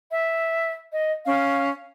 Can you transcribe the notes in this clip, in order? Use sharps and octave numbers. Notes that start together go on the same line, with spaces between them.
E5
D#5
C#4 F5